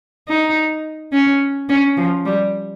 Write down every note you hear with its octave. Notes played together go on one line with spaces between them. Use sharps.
D#4
C#4
C#4
F3
G3